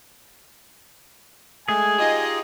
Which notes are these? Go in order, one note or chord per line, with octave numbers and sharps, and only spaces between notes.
G#3 A3 G#4 G#5
D#4 F4 G4 D#5